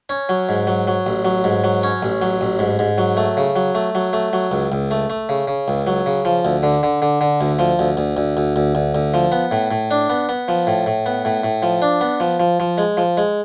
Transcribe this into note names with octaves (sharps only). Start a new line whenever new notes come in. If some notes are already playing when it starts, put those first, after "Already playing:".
C#4
F#3
G#2
F#3
F#3
A1
F#3
G#2
F#3
C#4
A1
F#3
A1
G#2
G#2
F#3
A3
C#3
F#3
A3
F#3
A3
F#3
C#2
C#2
A3
A3
C#3
C#3
C#2
F#3
C#3
F3
D2
D3
D3
D3
D3
D2
F3
D2
D2
D2
D2
D2
D2
D2
F3
B3
A2
A2
D4
B3
B3
F3
A2
A2
B3
A2
A2
F3
D4
B3
F3
F3
F3
G#3
F3
G#3